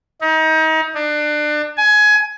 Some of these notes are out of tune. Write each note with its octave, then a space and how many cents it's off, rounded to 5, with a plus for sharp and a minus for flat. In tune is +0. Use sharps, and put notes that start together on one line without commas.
D#4 +30
D4 +30
G#5 +20